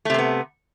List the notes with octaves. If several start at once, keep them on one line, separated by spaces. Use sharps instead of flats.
C3 A3 B3 C4